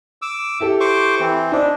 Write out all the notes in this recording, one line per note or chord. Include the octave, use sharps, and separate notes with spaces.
D6 E6
E4 G4 A4
C5 C#6 D6
E3 C4
D4 D#4 C5